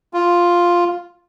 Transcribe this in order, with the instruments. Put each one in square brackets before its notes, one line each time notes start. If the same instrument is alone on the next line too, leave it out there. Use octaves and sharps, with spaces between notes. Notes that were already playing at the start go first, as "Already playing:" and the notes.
[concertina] F4